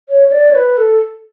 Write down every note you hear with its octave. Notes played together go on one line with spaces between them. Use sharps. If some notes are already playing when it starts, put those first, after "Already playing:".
C#5
C#5
D5
C#5
B4
A4